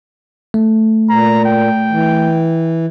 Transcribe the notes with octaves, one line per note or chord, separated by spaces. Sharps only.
A3
A#2 A#5
G5
E3